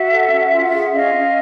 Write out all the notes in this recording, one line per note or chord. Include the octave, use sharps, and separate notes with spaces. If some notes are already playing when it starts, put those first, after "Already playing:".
Already playing: F#4 E5 F#5
A4
C#4
F4
G#4
C#4 D#5 F5
C#4